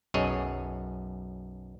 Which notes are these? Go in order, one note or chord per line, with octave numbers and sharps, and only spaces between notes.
B1 F#2 G#4 C#5 D#5